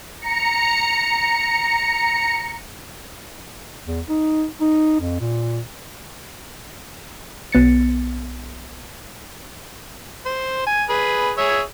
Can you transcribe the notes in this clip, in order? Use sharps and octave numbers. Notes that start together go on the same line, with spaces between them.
A#5 C#7
E2
D#4
D#4
F2
A#2
B1 B3 A6 C#7
C5
G#5
G#4 B4
G#4 C#5 E5